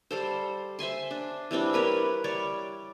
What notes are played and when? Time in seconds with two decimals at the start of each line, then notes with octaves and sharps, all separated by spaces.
0.11 G3 A4 C5
0.79 C5 E5 G#5 C6
1.11 D4
1.51 E3 G3 C4 D4
1.73 G4 A#4 B4 C#5
2.24 G3 C#5 D5